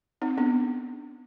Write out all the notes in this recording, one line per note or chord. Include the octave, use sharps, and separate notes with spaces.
C4 D#4
B3 D4